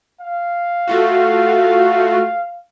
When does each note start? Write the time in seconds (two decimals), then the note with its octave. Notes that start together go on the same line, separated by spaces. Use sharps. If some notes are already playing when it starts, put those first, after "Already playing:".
0.21 F5
0.87 A3 F4 F#4